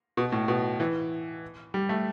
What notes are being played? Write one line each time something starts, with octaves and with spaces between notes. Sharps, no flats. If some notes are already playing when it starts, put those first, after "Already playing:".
B2
A2
B2
E3
G3
A3